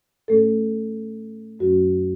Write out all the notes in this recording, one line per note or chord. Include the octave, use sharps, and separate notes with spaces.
A2 A3 C#4 A4
F#2 F#3 C#4 F#4